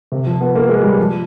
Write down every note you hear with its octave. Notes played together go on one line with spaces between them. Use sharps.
C3
F3
B3
A#3
G#3
G3
F3